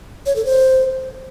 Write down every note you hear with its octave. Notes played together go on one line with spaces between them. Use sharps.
C#5
A4
C5